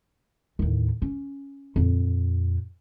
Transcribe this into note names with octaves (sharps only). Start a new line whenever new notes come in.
D#2 A2
C#4
F2 A#2